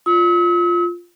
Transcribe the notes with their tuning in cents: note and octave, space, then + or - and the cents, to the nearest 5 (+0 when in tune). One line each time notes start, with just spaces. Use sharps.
F4 +0 E6 -45